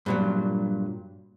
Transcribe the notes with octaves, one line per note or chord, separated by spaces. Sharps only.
G2 A#2 F#3